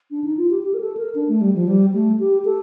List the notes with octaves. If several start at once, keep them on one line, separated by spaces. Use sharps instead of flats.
D4
D#4
F4
G4
G4
A#4
A4
A#4
D4
A3
G3
F3
G3
A3
G4
A4